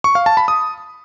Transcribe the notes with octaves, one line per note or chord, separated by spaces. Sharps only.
C#6
F5
A5
B5
D#6